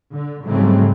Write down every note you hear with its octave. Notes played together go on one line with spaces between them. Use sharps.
D3
G#2 C#3 F#3 G3 A3 C4